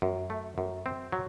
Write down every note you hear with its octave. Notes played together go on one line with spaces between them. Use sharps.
F#2
A3
F#2
C4
F#3